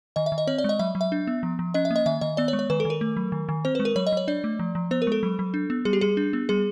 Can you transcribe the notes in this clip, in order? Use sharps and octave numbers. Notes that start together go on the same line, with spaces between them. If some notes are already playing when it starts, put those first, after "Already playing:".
D#3 D#5
E5
D#3
D#5
C4 C#5
D5
G#3 D#5
F#3 E5
F#3
E5
D4
B3
F3
F3
C#4 D#5
E5
A#3
D#5
D#3 E5
D#3 D#5
B3 D5
C#5
G#3
C#5
D#3 B4
A4
D#3
A#4
A3
F#3
D#3
D#3
C4 C5
B4
G#3
A#4
F#3 C#5
D#5
F#3 C#5
D4 D5
A3
F3
F3
B3 C5
A#4
G#3 A4
F#3
F#3
D4
B3
G3 G#4
G4
G3 G#4
D4
B3
G3 G#4